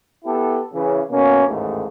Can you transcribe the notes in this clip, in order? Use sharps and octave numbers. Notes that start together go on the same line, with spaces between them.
B3 E4 G4 A4
C#3 E3
B2 A#3 C#4
A1 D#2 G#2 A3 A#3